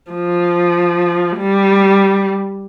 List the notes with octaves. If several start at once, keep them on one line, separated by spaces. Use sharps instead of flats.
F3
G3